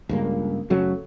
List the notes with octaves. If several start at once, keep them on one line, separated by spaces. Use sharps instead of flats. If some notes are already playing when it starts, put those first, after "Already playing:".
C#2 G2 A#3
F#2 C#3 F#3 A3